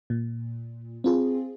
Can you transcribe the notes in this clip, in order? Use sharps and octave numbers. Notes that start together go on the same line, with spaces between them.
A#2
C4 F4 G#4